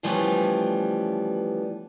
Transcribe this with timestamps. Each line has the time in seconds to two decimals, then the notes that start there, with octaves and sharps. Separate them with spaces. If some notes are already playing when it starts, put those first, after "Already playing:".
0.03 C#3 E3 F3 G3 A3 B3